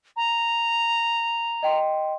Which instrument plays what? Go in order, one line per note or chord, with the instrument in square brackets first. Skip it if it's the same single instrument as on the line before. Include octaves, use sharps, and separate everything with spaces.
[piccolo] A#5
[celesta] D#5 G5 C6